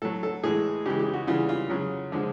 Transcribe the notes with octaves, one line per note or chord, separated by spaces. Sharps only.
A2 F#3 A4
A4
A2 E3 G#3 G#4
C#3 E3 G#3 G4
G4
F#4
C#3 E3 G3 F4
F4
C#3 F#3 F4
D3 F3 G#3